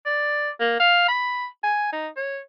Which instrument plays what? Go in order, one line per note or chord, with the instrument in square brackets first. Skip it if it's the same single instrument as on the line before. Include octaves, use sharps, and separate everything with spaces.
[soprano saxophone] D5
A#3
F5
B5
G#5
D#4
C#5